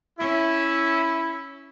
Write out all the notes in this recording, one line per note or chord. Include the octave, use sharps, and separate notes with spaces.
C#4 E4